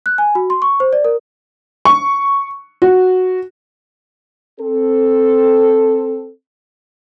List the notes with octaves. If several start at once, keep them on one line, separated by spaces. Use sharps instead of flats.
F#6
G#5
F#4
C6
C#6
C5
D5
A#4
C#6
F#4
C4 A4